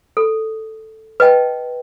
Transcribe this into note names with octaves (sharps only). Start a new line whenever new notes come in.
A4
B4 D#5 G5 A5